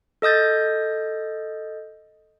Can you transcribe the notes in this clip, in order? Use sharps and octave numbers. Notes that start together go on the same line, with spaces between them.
A4 D#5 D#6 G6 A6